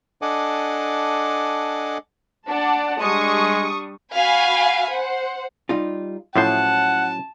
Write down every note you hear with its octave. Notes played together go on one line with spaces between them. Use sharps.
D4 A4 D#5 F#5 G#5 D6
D4 D5 F#5 A5
G3 G#3 D4 C#6 D#6
F#4 F5 G#5 B5
C5 F#5
G3 D#4 F4
A2 F3 F#3 C#4 E4 C5 F#5 A5